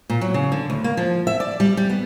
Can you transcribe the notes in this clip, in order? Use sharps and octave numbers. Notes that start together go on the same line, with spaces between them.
A#2
F#3
C#3
D3
D2
A#3
F3
E5
D5
G3
G3
B3